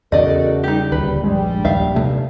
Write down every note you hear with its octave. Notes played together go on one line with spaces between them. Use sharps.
E2 C#3 A3 F#4 A#4 D5 D#5
G3 D#4 G4
D#1 D2 B4
A#1 G2 G3 G#3
D#2 E5 F5
C3 A3